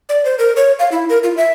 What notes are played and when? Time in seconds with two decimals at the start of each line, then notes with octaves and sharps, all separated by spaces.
0.09 D5
0.25 C5
0.39 A#4
0.56 C#5
0.79 F5
0.92 E4
1.09 A#4
1.23 F4
1.37 E5